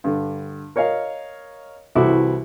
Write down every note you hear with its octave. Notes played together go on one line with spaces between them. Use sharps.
G2 D3
A#4 C#5 D#5 F5
C2 E3 E4 F#4 A4 D6